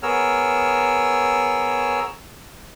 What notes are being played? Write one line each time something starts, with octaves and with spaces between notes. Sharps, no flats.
B3 G#4 A#4 C#5 E6 F6